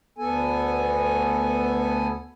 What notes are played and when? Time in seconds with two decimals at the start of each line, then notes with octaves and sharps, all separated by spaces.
0.18 D2 B3 A4 G#5